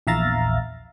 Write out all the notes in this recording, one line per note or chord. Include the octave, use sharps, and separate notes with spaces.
A#1 E2 E5 F5 A#5 A6